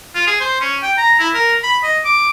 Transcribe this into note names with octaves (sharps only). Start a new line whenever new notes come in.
F4
G#4
C5
C#4
G5
A#5
E4
A#4
B5
D#5
D6